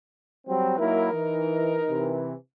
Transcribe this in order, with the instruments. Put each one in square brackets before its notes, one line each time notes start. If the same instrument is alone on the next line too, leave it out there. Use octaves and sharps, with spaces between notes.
[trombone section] F#3 G3 C4
[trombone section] F#3 A#3 E4 [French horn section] D#4 A#4
[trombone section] E3
C3 E3